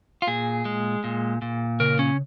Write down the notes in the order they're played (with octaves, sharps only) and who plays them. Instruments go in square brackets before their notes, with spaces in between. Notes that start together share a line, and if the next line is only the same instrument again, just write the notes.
[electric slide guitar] F4
A#2 G#4
G#3
A#2
A#2
C#3 A#4
C#4